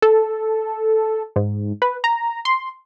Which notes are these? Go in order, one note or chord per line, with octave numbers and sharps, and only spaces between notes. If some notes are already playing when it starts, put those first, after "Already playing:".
A4
G#2
B4
A#5
C6